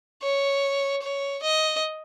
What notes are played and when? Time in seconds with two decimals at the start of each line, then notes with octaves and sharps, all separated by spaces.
0.22 C#5
1.02 C#5
1.43 D#5